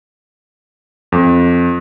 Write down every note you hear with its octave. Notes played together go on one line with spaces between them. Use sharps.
F2